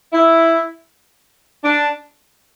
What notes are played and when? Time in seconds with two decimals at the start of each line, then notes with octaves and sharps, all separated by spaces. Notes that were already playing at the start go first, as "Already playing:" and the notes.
0.13 E4
1.63 D4